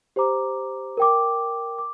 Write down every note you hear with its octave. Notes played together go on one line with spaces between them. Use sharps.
G4 C5 A#5 D6
A#4 G5 D6
D6